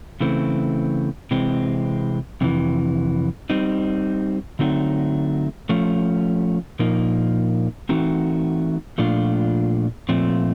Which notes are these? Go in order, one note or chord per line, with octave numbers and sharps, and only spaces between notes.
C#3 E3 A3 C4
C3 E3 G#3 C4
F2 C3 E3
G3 C4 D#4
D3 F#3 A3 C4 D#4
F3 A3 C#4
A#2 F3 A#3 D#4
E3 A3 C4 D#4 F#4
A#2 F3 A3 D4 F4
A#2 F3 A3 C4